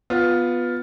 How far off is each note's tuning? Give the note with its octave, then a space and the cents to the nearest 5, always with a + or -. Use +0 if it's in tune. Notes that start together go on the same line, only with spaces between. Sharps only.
B3 +0 F4 +10